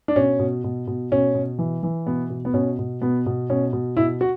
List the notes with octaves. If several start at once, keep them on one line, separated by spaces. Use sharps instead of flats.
D4
B2 C#4
B2
B2
B2
B2 C#4
B2
E3
E3
B2 B3
B2
B3
B2 C#4
B2
B2 B3
B2
B2 C#4
B2
B2 E4
F#4